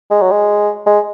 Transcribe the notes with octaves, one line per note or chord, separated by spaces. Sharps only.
G#3
F#3
G#3
G#3